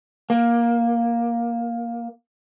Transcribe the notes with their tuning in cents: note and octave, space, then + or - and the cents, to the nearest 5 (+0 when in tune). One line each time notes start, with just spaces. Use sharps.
A#3 +10